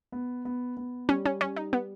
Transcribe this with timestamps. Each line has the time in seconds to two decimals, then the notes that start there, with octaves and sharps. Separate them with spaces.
0.12 B3
0.45 B3
0.77 B3
1.09 G3 C#4
1.26 C#4
1.41 G3 C#4
1.56 D#4
1.73 B3